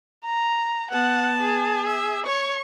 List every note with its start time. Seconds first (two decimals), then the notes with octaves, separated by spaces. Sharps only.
0.25 A#5
0.91 B3 F#5 A5
1.40 G#4
1.87 E5
2.26 C#5 C#6